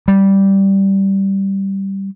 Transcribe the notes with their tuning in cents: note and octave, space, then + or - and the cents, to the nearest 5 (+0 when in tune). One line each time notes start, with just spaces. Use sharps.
G3 -5